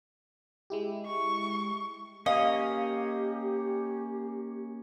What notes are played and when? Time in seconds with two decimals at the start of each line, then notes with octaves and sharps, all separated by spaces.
0.70 G#3 E4 G4
1.07 C#6
2.26 A#3 C#4 G4 D#5 F5